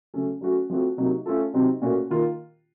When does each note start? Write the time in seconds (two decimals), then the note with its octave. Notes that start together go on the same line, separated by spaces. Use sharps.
0.14 C#3 F#3 A3 C#4 A4
0.41 F#3 A3 C#4 F#4
0.70 F3 A3 C4 F#4
0.97 C3 F#3 A#3 D#4
1.26 A3 C#4 F4 A4
1.53 C3 F#3 C4 D#4
1.82 A#2 A3 C#4 F#4 A#4
2.10 D#3 A#3 F4